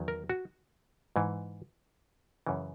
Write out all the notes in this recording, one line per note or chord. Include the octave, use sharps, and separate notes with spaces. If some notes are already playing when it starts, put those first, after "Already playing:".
Already playing: E2 D#3 F#3
A#4
F#4
G#2 E3
F#2 C#3 E3